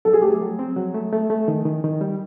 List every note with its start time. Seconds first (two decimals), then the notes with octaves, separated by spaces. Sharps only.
0.05 F#3 A4
0.13 G#4
0.22 A3 G4
0.30 G#4
0.41 F#3
0.59 C4
0.77 F#3
0.95 A3
1.13 A3
1.30 A3
1.48 D#3
1.65 D#3
1.84 D#3
2.01 G3